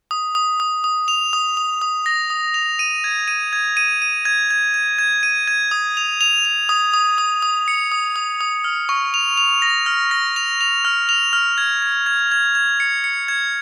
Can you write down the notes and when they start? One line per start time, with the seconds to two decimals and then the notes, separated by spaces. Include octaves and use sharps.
0.11 D#6
0.35 D#6
0.60 D#6
0.84 D#6
1.08 F7
1.33 D#6
1.57 D#6
1.82 D#6
2.06 A#6
2.30 D#6
2.54 F7
2.79 D#7
3.04 G#6
3.28 D#7
3.53 G#6
3.77 D#7
4.02 D#7
4.25 G#6
4.51 G#6
4.74 G#6
4.99 G#6
5.23 D#7
5.48 G#6
5.71 D#6
5.97 F7
6.21 F7
6.45 F7
6.69 D#6
6.94 D#6
7.18 D#6
7.43 D#6
7.68 C#7
7.92 D#6
8.16 D#6
8.41 D#6
8.64 F6
8.89 C#6
9.14 F7
9.37 F7
9.62 A#6
9.86 F6
10.11 A#6
10.36 F7
10.61 F7
10.85 F6
11.09 F7
11.33 F6
11.58 G#6
11.82 G#6
12.06 G#6
12.32 G#6
12.55 G#6
12.80 C#7
13.04 C#7
13.28 G#6